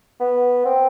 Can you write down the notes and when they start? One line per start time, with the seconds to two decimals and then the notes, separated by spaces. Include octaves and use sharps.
0.20 B3
0.65 C4